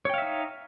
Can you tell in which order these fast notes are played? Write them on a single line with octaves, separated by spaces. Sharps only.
C#5 G5 F5 E5 D#4